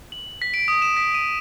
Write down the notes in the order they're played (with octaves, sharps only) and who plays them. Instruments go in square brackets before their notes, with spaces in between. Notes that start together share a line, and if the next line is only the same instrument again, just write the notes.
[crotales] F#7
B6
D7
D#6
E7
B6
D#7